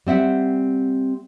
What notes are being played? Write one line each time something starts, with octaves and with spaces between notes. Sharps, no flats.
G3 C4 E5 F#5